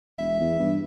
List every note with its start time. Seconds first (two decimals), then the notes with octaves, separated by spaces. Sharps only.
0.19 E1 E5
0.40 E2
0.60 G2